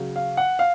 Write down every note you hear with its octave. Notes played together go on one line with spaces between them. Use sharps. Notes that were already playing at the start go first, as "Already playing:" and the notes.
Already playing: C#3 F#3
F5
F#5
F5